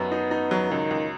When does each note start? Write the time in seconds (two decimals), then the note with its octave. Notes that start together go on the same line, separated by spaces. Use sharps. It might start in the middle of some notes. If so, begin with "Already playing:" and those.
Already playing: F#2 F#3 B3 D#4
0.12 D#4
0.31 D#4
0.51 F#3
0.71 C#2 D#3
0.91 C#2